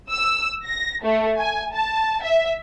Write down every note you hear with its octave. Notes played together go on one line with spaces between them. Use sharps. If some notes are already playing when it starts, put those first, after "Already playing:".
E6
A#6
A3
G#5
A5
E5